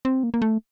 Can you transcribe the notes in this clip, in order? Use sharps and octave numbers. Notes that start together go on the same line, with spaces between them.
C4
A#3
A#3
A3